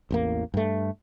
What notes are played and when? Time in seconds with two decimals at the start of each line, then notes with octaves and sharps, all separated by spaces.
0.11 A1 E2 A#3
0.54 G2 A3